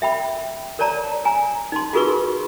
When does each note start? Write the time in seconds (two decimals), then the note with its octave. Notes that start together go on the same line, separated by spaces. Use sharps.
0.02 E5 G5 B5
0.79 A#4 C#5 D5 A5 A#5
1.25 G#5 A#5
1.72 D#4 C6
1.93 F4 F#4 G#4 A#4 B4 C#6